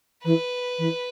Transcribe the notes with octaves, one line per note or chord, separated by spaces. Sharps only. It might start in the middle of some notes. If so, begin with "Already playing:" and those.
E3 B4
E3